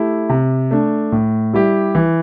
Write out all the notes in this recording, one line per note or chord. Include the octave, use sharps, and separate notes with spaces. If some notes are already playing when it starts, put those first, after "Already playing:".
Already playing: A3 E4 G4
C3
A3 D4
A2
G3 E4 G4
E3